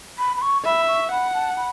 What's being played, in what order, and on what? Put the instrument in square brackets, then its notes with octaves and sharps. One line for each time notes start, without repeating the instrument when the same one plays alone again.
[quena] B5
B5
C#6
[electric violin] E5 [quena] B5
[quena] C#6
[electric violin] F#5 [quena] B5
[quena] A5
B5